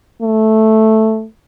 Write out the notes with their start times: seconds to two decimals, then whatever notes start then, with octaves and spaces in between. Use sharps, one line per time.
0.22 A3